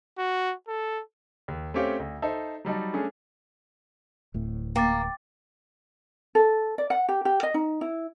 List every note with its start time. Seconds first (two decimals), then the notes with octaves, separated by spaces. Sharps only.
0.18 F#4
0.68 A4
1.48 D#2
1.74 A3 C4 C#4 G4 C#5 F5
2.00 D2
2.22 D#4 A4 C5 E5
2.65 F#3 G3 D#4 A5
2.93 A3 C#4 D4 G#4
4.34 D1 A2
4.76 A#3 G5 D6 A6
6.35 A4
6.78 D5
6.90 F#5
7.09 G4
7.25 G4
7.43 D#5
7.54 D#4
7.81 E4